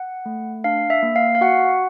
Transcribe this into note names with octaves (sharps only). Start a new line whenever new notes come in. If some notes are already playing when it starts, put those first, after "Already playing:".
Already playing: F#5
A3
D4 F5
E5
A#3
F5
F5
F#4 F#5